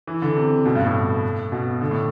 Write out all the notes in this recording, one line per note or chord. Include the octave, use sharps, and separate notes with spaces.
E3
D3
C3
B2
G2
A2
B2
D3
A2